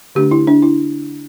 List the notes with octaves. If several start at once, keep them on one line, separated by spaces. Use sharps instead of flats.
D3 A3 D4 G4
E4
D4
E4